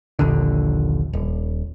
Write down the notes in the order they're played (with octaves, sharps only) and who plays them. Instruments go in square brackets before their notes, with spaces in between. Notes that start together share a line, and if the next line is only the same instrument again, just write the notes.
[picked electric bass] D#1 A#1 D#2 D3
D#1